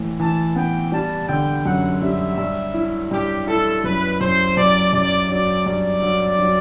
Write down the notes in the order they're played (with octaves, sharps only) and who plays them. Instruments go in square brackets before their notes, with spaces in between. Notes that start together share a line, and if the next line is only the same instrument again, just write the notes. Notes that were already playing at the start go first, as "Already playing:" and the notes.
Already playing: [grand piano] A2 E3
[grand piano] E3 [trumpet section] A5
[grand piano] B3 [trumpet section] G5
[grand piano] G3 [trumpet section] A5
[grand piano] D3 [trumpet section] G5
[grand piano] F#2 [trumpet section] F#5
[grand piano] G3 [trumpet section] E5
[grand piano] G2
E4
[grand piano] G2 [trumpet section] G4
[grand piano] E4 [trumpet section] A4
[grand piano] F#2 [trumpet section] B4
[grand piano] F#2 [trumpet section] C5
[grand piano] F#2 [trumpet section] D5
[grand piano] F#2 [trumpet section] D5
[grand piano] F#3 [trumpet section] D5
[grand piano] G2 [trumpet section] D5
[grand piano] F#3
F#3